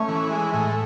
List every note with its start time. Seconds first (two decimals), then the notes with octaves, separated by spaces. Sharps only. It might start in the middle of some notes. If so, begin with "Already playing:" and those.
Already playing: A3 C#4
0.08 E3
0.31 G#3
0.53 A2